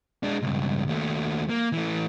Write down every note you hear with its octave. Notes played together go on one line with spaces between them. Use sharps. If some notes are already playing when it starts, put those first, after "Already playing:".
G#3 D4
C#2 G2
D#2 A3
A#3
E3 A3